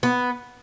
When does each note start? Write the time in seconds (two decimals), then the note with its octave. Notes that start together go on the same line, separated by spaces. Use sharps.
0.03 B3